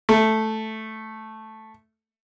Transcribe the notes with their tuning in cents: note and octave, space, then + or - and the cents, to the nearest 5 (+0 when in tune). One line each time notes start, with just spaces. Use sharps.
A3 -5